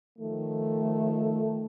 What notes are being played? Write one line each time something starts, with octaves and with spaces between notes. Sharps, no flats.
D#3 F3 A3